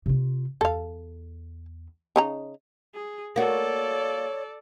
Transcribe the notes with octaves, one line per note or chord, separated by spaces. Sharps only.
C3 F4
E2 A4 F5
C#3 D#4 A#5
G#4
A#3 F#4 A4 C#5 D5